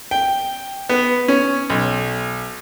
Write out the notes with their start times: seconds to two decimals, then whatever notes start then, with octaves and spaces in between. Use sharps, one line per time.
0.11 G5
0.89 B3
1.28 C#4
1.70 B1